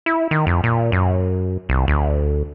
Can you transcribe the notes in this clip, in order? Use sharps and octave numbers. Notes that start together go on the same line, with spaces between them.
E4
D#3
F2
A#2
F#2
C2
D2